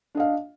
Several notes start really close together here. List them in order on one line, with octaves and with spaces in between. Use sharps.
D4 D#5 F5